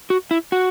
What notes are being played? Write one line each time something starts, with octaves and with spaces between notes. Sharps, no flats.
F#4
E4
F#4